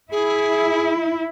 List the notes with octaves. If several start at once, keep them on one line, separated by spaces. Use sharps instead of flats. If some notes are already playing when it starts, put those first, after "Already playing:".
E4 G#4